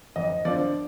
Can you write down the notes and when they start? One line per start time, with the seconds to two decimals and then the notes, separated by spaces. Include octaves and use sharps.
0.16 F2 D#5
0.45 D3 F3 D5